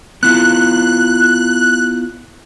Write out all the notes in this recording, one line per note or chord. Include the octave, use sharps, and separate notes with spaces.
B3 E4 F4 F#6